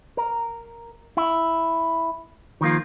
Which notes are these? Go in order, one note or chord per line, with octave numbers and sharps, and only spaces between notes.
A#4
E4
D#3 F3 A#3 F4